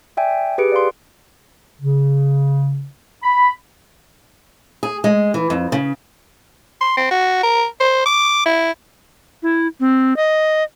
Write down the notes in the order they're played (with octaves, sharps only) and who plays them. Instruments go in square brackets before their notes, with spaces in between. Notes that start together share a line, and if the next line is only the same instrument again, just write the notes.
[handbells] D5 E5 G5 G#5
G4 G#4 B4 C#7 D7
D5 F5 C6
[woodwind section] C#3
B5
[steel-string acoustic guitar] G#4
G#3
E3
F2
C#3
[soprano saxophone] C6
C4
F#4
A#4
C5
D6
E4
[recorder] E4
C4
D#5